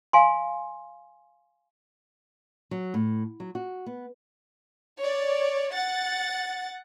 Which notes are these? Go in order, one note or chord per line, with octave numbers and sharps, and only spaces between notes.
F5 G#5 C6
F#3
A2
F#3
F#4
B3
C#5 D5
F#5 A6